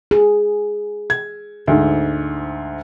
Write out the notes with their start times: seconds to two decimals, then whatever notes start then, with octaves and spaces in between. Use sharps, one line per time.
0.11 G#4
1.10 G#6
1.67 D2 G#2